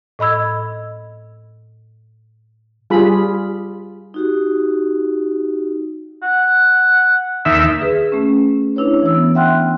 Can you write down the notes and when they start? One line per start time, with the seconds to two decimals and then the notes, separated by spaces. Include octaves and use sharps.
0.19 A2 D#5 B5 E6 G#6
2.90 G3 F4 G#4 B5
4.14 D#4 F#4 G4
6.23 F#5
7.45 D#2 E5
7.81 G#4 B4
8.12 A3 C#4
8.76 D4 E4 B4 C#5
9.03 E3 E6
9.15 B3
9.35 E5 F#5 G5 C6 F6 F#6